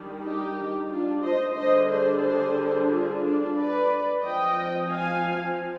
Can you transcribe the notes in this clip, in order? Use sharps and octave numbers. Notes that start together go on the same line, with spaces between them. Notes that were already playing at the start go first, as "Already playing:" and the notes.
Already playing: D#3 G3 D4
D#4 G4
D4 F4
C5 D#5
D3 G3 D4 C5 D#5
G#4 C5
G#4 C5
F4 G#4
D4 F4
B4 D5
F3 C4 D#5 G5
F5 G#5